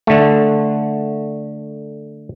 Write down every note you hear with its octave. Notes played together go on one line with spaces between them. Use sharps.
D3 A3